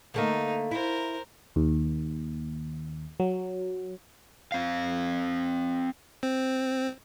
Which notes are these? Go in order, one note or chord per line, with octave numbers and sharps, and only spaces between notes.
D3 A3 A#3 D#4
E4 A#4 C5
D#2
F#3
C4 F5
C4